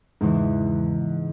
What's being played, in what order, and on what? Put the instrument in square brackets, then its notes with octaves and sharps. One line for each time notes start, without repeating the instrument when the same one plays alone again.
[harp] E2 C#3 E3 [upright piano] G#2